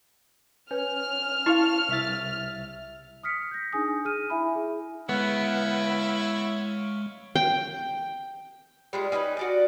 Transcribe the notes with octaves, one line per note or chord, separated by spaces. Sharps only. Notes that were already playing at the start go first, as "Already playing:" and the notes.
C#4 B4 F6
E4 F5 A5 C#6
C2 E5 A6
D#6 F6 B6 C#7
G6 A#6
D4 D#4 G#4 G#5 D#6
G#4 F6 D#7
E4 E5 G#5 B5
G#4
G#3 B3 E4 C#5 F5
G5
G3 G#3 F4
C#4 D#4 A#4 B4
F#4 D5 D#5